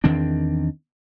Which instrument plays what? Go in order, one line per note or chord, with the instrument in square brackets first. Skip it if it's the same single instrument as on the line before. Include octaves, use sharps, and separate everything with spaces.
[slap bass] E2 D#3 C4 D4